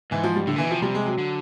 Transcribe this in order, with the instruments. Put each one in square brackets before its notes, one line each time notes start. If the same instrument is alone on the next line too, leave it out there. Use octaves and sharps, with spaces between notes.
[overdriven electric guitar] G#2 [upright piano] E3
[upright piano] F3
G3
[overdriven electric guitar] A2 [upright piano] D3
[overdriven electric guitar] A#2 [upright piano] E3
[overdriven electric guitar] B2
[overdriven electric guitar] C3 [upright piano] F3
[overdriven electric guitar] C3 [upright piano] G3
[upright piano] G#3
F#3
[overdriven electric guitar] D3